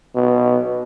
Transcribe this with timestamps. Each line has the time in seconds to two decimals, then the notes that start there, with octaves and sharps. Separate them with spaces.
0.16 B2